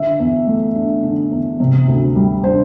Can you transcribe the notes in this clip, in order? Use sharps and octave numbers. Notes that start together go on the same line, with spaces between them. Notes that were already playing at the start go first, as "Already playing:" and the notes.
Already playing: D3 E5
E2
A3
D4
D3
E2
C3
D2
G3
D4 C5